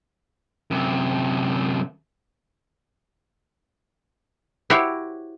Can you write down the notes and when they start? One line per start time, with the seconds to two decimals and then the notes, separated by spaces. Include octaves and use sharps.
0.71 F#2 C3
4.70 E4 F#4 G4 C5 C#5 E5